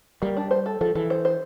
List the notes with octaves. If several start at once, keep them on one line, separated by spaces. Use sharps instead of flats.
G3 A#3
D4
C5
A4
F3 A4
E3 A4
C5
C5